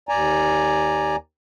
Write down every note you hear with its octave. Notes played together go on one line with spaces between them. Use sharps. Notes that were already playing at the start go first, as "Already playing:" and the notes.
D#2 D5 G#5 A#5